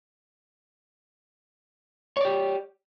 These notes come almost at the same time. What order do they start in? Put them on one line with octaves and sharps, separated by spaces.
C#5 D5 G4